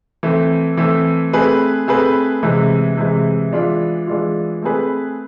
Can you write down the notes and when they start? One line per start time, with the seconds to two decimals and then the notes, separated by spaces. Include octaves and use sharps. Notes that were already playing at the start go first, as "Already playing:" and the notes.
0.23 E3 A3 C4
0.77 E3 A3 C4
1.33 A3 C4 G#4 B4
1.87 A3 C4 G#4 B4
2.43 C3 E3 G#3
2.97 C3 E3 G#3
3.53 E3 G#3 D4 F4
4.07 E3 G#3 D4 F4
4.62 A3 C4 G#4 B4